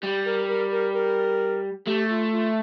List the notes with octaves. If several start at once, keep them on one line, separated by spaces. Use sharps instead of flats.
G3 G4
A#4
A#4
A#4
A#4
A3 G4
F4
F4